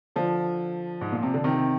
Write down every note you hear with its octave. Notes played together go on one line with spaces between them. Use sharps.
D3 F3
G#2
A#2
C3
D3
C3 D#3